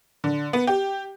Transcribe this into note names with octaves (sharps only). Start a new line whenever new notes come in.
D3
B3
G4